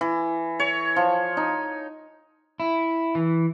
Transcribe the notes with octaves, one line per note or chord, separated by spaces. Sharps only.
E3
C#5
F3
D#4
E4
E3